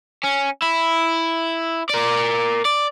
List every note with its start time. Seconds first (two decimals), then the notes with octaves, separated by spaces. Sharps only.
0.24 C#4
0.63 E4
1.89 A#4 D5
2.66 D5